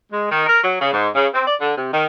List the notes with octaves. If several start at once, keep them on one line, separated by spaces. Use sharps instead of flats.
G#3
D#3
A#4
F#3
C#3
G#2
C#3
C4
D5
D3
C3
D#3